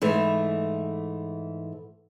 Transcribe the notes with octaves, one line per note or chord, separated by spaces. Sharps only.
G#2 E3 A3